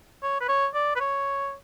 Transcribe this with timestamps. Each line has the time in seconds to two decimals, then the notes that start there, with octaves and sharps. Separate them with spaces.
0.23 C#5
0.41 B4
0.48 C#5
0.74 D5
0.96 B4
1.00 C#5